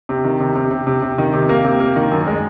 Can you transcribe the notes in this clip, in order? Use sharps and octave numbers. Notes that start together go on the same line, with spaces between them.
C3
D#3
C3
C3
C3
C3
C3
D#3
C3
A#3
C3
A#3
D#3
F#2
G#3